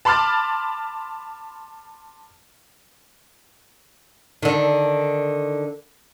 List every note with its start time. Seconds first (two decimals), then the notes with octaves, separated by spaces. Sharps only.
0.05 A5 B5 C6 D6 F6 A6
4.42 D3 D#3